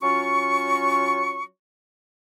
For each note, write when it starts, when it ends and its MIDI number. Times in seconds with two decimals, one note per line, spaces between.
0.01 1.44 54
0.01 1.44 61
0.01 1.44 65
0.01 1.44 85